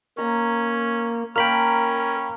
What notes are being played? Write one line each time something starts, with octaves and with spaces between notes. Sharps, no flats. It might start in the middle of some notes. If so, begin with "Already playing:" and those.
A#3 C#4 A#5
A#3 C#4 A#4 G5 A5 B5 F6